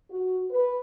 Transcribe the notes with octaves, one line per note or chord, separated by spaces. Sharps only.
F#4
B4